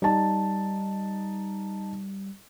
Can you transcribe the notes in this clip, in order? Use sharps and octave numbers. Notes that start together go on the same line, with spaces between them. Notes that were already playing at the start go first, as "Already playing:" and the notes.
G3 D#4 A5